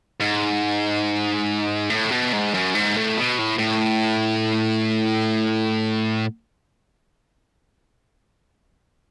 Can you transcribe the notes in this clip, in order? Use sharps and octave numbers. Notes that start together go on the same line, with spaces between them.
G#2
A2
B2
G#2
F#2
G#2
A2
B2
A2
A2